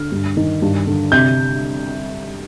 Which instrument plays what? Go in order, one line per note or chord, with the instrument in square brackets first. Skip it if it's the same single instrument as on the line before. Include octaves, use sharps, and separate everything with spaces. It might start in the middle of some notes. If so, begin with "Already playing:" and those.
Already playing: [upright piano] D3 F6
G2
D#3
G2
D3
C3 G6